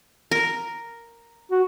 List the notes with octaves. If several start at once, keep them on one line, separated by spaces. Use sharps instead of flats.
A#4
F#4